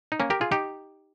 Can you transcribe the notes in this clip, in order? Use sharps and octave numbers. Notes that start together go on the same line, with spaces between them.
D#4
A#3 C#4
G4 A#4
F4 G#4
D#4 G4